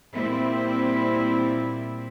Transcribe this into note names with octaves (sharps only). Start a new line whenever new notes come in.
A#2 G3 C4 E4